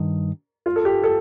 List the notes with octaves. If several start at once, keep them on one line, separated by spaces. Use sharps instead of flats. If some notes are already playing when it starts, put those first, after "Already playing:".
Already playing: G2 D#3 D#4
F4
A4
G4
A4